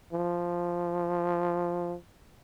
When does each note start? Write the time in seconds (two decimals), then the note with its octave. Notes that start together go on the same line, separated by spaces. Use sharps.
0.13 F3